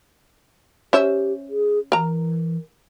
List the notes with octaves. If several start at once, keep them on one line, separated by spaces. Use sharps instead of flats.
C#4 G4 C5 E5
G#4
E3 A#4 A#5